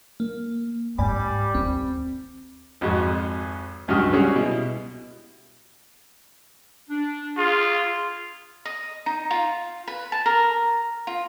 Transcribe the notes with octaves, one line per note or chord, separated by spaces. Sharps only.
A#3
G#2 G3 D5 G#5 B5
D#2 C4
G#1 F2 G#3 F#4
C#2 G2 F#3 F#4 D#5 F6
G3 C#4 F#4 G#4
B2 E4
D4
F4 G#4
D#5
D#4
F4
B4
A5
A#4
F4